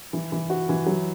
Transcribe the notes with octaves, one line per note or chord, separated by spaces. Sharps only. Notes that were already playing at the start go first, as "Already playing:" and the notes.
E3
E3
F#4
E3
F#3